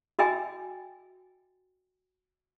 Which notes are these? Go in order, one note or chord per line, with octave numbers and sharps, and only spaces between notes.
F#4 D#5 E5 G5 G#5